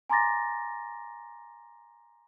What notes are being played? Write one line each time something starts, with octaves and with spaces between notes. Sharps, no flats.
G#5 A#5 C6 D6 A6 A#6